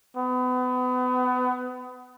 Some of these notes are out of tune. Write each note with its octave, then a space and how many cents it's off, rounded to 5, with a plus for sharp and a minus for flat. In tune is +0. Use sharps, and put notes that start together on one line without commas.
B3 +30